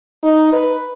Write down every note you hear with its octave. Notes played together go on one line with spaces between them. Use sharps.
D#4
B4